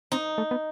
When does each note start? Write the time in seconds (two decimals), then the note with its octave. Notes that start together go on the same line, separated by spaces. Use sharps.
0.12 C4 D#4
0.38 A3
0.51 B3